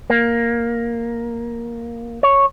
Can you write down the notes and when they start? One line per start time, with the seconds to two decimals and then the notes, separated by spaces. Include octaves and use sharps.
0.10 A#3
2.23 C#5